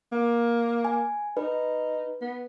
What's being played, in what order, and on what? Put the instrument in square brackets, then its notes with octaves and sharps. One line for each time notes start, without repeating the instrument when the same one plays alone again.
[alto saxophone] A#3
[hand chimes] G#5
[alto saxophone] D#4 [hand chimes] B4
[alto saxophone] B3